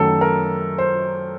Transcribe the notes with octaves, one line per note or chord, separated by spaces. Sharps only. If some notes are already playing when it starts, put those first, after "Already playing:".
Already playing: F#2 D#3 F#3 A3 A4
A#4
C5